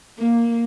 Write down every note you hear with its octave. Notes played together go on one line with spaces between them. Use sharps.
A#3